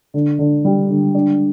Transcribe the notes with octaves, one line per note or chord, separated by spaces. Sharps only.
D3
D3
G3
D3
D4